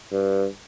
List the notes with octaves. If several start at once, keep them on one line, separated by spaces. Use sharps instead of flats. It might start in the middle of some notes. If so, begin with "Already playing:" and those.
G2